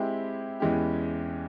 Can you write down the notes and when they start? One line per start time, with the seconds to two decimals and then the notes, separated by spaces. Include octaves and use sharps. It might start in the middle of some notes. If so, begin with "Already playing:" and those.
Already playing: G#3 C4 E4 G4
0.60 E2 E3 G#3 C#4 G4